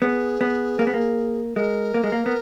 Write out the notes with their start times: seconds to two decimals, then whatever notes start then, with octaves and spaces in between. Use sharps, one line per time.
0.02 B3 G#4
0.41 B3
0.79 A#3
0.87 B3
0.94 A#3
1.56 G#3 A#4
1.94 A#3
2.04 G#3
2.12 A#3
2.26 B3